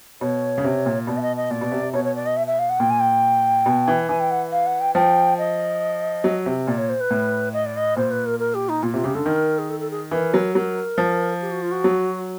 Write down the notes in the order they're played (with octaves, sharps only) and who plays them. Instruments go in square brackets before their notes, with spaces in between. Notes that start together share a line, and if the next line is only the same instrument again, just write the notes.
[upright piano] B2 [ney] C#5
[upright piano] C#3
C3
A#2
[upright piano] B2 [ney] D5
[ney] E5
D#5
D#5
[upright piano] A#2 [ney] D5
[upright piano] B2
C3
C3
[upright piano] B2 [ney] C#5
[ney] C#5
D5
D#5
E5
E5
F5
F#5
[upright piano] A#2 [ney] G5
[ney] G#5
G5
[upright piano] B2
E3
[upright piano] E3 [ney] G#5
[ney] G5
F#5
F5
F#5
G5
[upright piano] F3 [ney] G5
[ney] D#5
[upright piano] F#3
C3
[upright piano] A#2 [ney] D5
[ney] C#5
C5
B4
[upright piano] A2
[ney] D#5
D5
D#5
[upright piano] A#2 [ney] C5
[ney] B4
A#4
A#4
G4
D#4
[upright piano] A#2 [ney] F4
[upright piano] C3 [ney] F4
[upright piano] C#3 [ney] G4
[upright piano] D3 [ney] A4
[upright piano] D#3 [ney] A#4
[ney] G#4
A4
A4
G#4
[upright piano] E3 [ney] A#4
[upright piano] F#3
[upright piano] F#3 [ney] A#4
[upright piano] F3
[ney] G4
F#4
F4
F#4
[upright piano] F#3